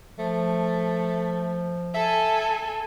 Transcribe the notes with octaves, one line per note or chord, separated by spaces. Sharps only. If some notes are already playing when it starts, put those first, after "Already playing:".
F3 A3
A4 E5 G#5